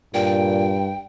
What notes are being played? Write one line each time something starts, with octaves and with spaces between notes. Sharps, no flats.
G2 A#2 G5